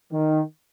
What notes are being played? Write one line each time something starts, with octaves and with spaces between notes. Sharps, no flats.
D#3